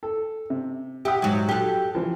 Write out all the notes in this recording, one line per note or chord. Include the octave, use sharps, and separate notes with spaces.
A4
C3
G4 E5 F#5 D#6
G#2 F#3
F#3 G4 A4 F#6
E3 F3